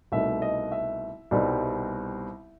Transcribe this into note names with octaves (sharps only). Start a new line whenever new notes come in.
C2 B2 A3 D#4 E5
D#5
E5
C2 B2 G3 C4 D#4